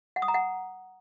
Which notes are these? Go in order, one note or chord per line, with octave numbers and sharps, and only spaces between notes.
F#5
D#6
A#5
F#5